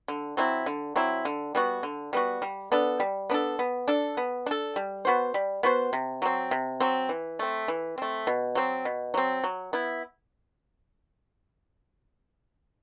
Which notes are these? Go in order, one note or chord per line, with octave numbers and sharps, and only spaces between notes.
D3
F#3 C4 E4
D3
F#3 C4 E4
D3
G3 B3 F#4
D3
G3 B3 F#4
G3
B3 D4 A4
G3
B3 D4 A4
B3
D4 A4
B3
D4 A4
G3
B3 F#4 C5
G3
B3 F#4 C5
C3
F#3 C4
C3
F#3 C4
E3
A3 C4
E3
A3 C4
B2
F#3 C4
B2
F#3 C4
F#3
B3 E4